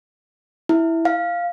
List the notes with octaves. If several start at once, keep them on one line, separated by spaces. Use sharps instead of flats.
E4
F5